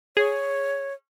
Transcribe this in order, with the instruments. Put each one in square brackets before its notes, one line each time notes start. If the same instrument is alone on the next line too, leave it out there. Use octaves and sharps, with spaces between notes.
[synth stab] G#4 [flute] C#5